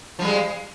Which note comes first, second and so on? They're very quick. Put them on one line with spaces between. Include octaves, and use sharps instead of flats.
F3 G3 G#3